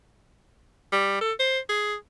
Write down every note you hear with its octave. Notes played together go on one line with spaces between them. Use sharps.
G3
A4
C5
G#4